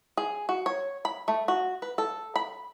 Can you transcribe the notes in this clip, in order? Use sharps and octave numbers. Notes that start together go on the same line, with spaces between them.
G#4
F#4
C#5
B5
A3
F#4
B4
A4
B5